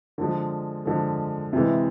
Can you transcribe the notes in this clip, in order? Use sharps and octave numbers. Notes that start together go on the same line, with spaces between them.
D3 F3 G#3
D3 F3 G#3
C3 E3 G#3